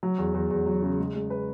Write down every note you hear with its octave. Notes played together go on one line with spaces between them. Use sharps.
F#3
E2
E2
E2
F#3
C#3
G#3
G#3
B4